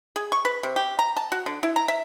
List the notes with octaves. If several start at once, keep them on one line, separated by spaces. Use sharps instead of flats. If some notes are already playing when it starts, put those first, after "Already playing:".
G#4
C#6
B4
C3
G4
A#5
A5
F#4
D3
E4
A#5
E5